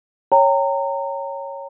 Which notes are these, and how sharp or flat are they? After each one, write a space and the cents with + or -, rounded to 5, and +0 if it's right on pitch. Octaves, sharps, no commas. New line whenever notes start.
C#5 +0 G5 +0 A#5 -25